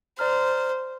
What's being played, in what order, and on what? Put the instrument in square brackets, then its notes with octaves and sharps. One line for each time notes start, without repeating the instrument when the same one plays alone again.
[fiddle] C5 [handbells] D5 A#5 F6